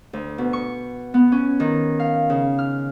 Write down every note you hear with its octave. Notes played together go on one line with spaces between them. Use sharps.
D2
B2
C#6
B3
C#4
D#3
F5
C#3
F6